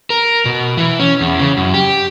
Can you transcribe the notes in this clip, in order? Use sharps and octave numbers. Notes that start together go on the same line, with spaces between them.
A#4
B2
E3
C#4
E2
C#3
F#2
G4